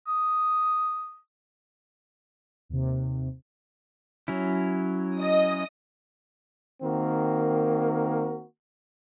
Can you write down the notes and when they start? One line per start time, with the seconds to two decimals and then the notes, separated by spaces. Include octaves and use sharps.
0.08 D#6
2.69 D#2 C3
4.28 F#3 C#4 E4
5.18 D#5 D#6
6.82 D#3 A#3 C4 F#4 A#4